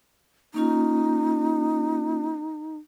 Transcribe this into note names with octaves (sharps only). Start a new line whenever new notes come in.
A#3 C#4 D#4 F4